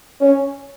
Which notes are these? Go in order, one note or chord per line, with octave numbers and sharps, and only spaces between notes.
C#4